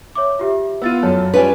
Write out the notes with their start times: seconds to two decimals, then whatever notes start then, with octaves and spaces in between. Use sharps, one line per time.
0.15 C#5 E5 D6
0.39 F4 G4 E5
0.82 B3 F4 E6 A6 D#7
1.03 F#2 A4 C#5
1.34 G3 C#4 F4 B4 G#5